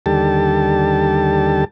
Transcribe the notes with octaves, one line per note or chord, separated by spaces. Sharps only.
D#2 D3 G3 G4 A4 A5